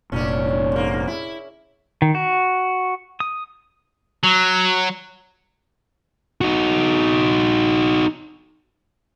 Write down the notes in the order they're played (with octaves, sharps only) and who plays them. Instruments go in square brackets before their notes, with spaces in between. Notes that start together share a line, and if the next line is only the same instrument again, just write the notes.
[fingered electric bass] F1 A#2 [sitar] C#4 D4
[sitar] G#2 A#3
E4
[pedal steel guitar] D#3
F#4
D#6
[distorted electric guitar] F#3
[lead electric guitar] D#4 F#4